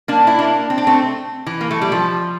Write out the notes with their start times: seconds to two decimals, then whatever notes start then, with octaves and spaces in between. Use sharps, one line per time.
0.08 A#3 D4
0.27 E4
0.39 A#3 D4
0.70 C4
0.78 D4
0.87 A3 C4
1.47 E3
1.61 A#3
1.71 A3
1.82 G3
1.92 F3